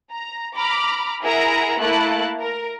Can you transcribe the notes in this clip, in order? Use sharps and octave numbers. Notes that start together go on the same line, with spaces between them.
A#5
A#5 B5 D6 F6
E4 G#4 A#4 E5 F#5 A#5
A3 A#3 E4 A5 F#6
A#4